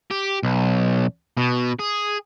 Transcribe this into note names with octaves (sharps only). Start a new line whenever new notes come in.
G4
B1
B2
G#4